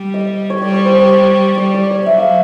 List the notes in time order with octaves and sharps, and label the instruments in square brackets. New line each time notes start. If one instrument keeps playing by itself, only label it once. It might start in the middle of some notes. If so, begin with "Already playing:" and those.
Already playing: [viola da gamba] G3
[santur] D#5
C#5
[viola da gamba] G3 [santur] D5
[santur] C#5
C5
C#5
C#5
[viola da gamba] G3 [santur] D5
[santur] D5
C#5
[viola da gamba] F#3 [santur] E5
[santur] F5